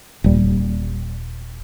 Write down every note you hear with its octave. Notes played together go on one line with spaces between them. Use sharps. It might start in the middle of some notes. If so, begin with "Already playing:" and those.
D#1 G3